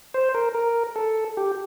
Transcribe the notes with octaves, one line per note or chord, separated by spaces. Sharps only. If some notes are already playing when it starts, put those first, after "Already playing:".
C5
A#4
A#4
A4
G4